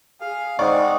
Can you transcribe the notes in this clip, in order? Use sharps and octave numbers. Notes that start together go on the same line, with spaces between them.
G#4 F5
G#3 C4 D#4 D5 F#5 C#6